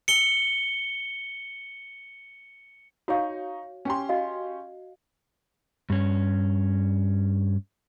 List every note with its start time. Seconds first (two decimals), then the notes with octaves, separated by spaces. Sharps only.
0.08 C#7 G7
3.08 D#4 F#4 C#5 F5 C#6
3.85 C#4 G4 C6
4.09 F#4 D#5 F5
5.90 G2 C#4